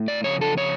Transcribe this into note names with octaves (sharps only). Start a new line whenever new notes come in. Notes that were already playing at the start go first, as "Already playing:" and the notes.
Already playing: A2
D5
F2 C#3 C#5
A4
C#5